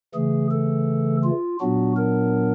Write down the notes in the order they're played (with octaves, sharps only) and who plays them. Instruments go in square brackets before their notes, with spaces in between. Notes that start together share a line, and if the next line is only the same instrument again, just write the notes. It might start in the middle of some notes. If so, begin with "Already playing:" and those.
[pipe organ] C#3 E3 A3 G#4
A4
F4
A#2 F#3 B3 D4 F#4
A#4